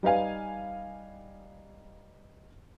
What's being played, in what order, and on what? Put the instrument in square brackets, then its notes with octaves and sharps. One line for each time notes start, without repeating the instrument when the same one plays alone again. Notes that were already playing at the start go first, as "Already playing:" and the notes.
[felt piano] G3 D#4 B4 F5 G#5